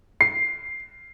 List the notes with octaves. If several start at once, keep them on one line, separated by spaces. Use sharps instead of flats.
C7